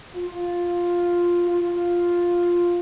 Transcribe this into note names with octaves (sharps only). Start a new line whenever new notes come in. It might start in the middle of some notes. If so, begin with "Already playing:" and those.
F4
F4